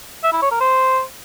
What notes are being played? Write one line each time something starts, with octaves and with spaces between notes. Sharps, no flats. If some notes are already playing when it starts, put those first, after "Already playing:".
E5
E4
C#5
A#4
C5